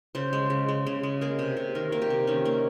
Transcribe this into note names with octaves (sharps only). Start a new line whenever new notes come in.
C#3 C5
G#3
C#3
G#3
C#3
G#3
A#3 G#4
C3
C3
D#3 A#4
A#3
G4
C3
D#3 C#4
A#3